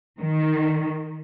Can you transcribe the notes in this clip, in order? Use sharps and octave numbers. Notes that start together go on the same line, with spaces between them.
D#3